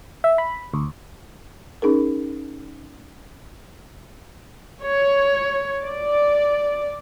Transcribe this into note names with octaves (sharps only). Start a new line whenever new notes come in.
E5
B5
D2
C#4 D#4 G#4 A#4
C#5
D5